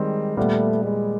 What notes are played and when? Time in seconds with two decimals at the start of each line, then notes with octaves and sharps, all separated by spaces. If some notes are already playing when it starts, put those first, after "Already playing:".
Already playing: D#3 G3 G#3 C4
0.37 A#2 G3 A3 B3
0.84 G#3